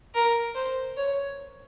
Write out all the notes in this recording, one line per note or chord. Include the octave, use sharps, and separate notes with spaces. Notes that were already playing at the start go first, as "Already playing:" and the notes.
A#4
C5
C#5